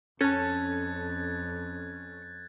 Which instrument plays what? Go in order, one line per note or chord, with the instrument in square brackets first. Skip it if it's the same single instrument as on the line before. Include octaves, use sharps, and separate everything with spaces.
[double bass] F2 [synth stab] C#4 [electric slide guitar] A4 A5 [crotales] F#6 G#6 A6